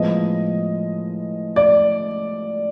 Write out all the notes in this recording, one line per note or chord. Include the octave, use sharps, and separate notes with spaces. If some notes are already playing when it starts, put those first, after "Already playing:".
Already playing: A2 F3 G#3 B3 D#5
D5